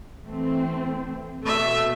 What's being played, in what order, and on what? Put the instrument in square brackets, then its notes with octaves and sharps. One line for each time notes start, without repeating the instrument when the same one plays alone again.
[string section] E3 A3 C4
[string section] B2 [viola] A3 E5